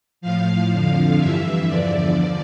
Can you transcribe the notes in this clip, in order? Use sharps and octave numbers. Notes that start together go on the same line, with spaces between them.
A2 F3 F5
F2 D3 F3 F5
G2 E3 E5
E2 D3 F3 D5